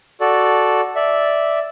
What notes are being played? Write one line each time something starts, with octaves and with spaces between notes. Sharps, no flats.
F#4 A4 D5
D5 E5